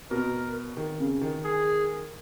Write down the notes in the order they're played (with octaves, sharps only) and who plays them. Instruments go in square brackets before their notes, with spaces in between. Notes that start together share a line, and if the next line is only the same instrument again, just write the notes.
[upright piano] B2 [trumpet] A#4
[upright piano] D#3
C#3
D#3
[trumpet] G#4